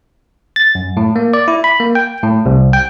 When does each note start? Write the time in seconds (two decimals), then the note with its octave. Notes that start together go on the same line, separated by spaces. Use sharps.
0.56 A6
0.75 F#2
0.97 A2
1.16 A#3
1.34 D5
1.48 E4
1.64 B5
1.80 A#3
1.95 G5
2.23 A2
2.46 C2
2.73 G5